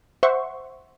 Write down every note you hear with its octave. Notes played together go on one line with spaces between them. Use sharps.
C5 E5 F#5 C6 C#6